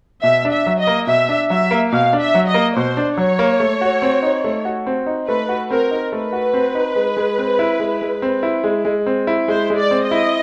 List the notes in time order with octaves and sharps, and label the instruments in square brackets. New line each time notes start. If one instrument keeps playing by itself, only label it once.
[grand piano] B2 [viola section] E5
[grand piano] D4
[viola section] E5
[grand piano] F#3
[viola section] D#5
[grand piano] A#3
[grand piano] B2 [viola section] E5
[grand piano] D4
[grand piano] F#3 [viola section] E5
[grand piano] A#3
[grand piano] B2 [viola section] F5
[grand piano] D4
[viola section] E5
[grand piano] F#3
[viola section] D#5
[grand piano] A#3
[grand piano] B2 [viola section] C5
[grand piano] D4
[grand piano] F#3 [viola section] C#5
[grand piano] A#3
A3
F#4
C4
D#4
A3
F#4
C4
D#4
[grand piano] A3 [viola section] B4
[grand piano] F#4
[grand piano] C4 [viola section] A#4
[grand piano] D#4
[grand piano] A3 [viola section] B4
[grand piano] F#4
C4
D#4
G#3
G#3
C4
E4
G#3
G#3
C4
E4
G#3
G#3
C4
E4
[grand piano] G#3 [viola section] C5
[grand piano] G#3
[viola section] D5
[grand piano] C4
[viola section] D#5
[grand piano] E4